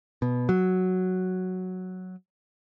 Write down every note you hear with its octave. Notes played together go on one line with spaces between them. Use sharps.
B2
F#3